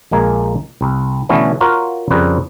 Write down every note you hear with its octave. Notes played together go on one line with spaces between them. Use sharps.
A#1 G#3 A#3 G#5
C2
B2 D3 E3 A3 B3 C#4
F4 F#4 A#4 C#5
F2 C#3 G3 A#4 B4